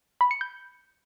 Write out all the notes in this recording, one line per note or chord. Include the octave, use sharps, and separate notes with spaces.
B5
C#7
G6